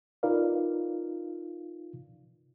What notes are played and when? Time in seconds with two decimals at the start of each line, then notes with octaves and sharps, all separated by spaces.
0.23 D#4 F4 A#4 B4 D5 F5